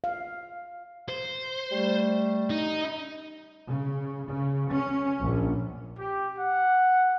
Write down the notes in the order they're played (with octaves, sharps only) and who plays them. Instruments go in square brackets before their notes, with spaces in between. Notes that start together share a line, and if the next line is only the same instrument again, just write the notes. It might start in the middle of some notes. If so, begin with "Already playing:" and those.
[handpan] F5
[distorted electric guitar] C5
[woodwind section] G3 A3
[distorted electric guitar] D#4
[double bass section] C#3
C#3
C#4
A#1
[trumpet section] G4
F#5